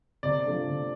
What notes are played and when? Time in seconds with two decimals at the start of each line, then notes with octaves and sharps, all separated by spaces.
0.23 C3 D5
0.45 F3 A3 D4
0.67 C3